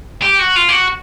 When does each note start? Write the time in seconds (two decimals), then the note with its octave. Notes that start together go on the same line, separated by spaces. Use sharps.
0.22 G4
0.39 F#4
0.56 F4
0.69 G4
0.73 F#4